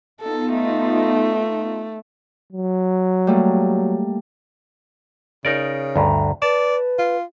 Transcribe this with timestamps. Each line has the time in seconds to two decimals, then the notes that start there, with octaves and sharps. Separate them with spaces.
0.20 B3 D#4 F4 A4
0.54 A3
2.52 F#3
3.27 G3 A3 A#3
5.45 C#3 D#4 A#4 D5
5.96 D2 G2 A#5
6.42 B4 D5 A5
6.98 F4